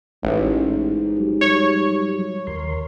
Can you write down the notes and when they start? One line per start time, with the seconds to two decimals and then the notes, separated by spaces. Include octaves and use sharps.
0.23 A1 G#2
1.17 F#3 G3
1.41 C#5
2.47 D#2 A#4 C6